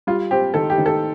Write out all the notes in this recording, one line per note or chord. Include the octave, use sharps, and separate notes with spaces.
G3 F4
C4 G4
D#3 A4
G4
D#3
A4